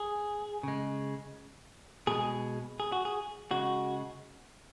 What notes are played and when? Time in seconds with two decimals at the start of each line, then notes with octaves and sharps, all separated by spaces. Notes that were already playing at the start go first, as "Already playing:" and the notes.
Already playing: G#4
0.63 C#3 G#3
2.07 B2 G#3 G#4
2.80 G#4
2.92 F#4
3.05 G#4
3.51 C#3 G#3 F#4